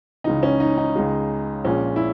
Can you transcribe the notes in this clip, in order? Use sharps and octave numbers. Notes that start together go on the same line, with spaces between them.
C#2 C#3 E3 D#4
C#4
D#4
D#4
C#2 C#3 G#3
A#1 A#2 G#3 C#4
E4